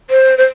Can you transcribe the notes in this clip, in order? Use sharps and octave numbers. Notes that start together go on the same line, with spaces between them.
C5
C5